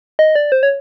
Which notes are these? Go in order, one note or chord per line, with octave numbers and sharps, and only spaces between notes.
D#5
D5
C5
C#5